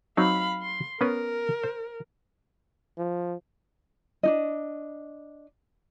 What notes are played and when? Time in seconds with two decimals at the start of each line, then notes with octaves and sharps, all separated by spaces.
0.17 F#3 C4 D#4 F5 B5
0.61 C6
1.01 B3 C#4 A#4 B4
1.63 C5
2.98 F3
4.23 D4 D#4 D#5